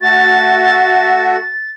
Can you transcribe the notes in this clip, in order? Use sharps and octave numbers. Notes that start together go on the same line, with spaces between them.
A3 F#4 A6